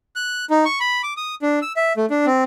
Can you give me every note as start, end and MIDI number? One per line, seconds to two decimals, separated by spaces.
0.16 0.45 90
0.50 0.64 63
0.65 0.79 85
0.80 1.02 83
1.03 1.14 86
1.17 1.35 87
1.42 1.59 62
1.62 1.72 88
1.76 1.93 76
1.97 2.06 57
2.10 2.26 62
2.26 2.44 60